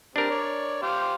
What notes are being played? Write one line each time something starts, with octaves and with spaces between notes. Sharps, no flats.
G3 C4 D4 A#4
C#5 D5
G4 C5 F5